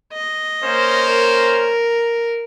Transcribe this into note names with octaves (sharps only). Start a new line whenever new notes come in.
D#5
A#3 C#4 C5
A#4